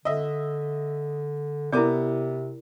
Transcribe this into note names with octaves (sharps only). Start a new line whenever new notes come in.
D3 D#5 E5
C3 B3 E4 A#4 D5 D6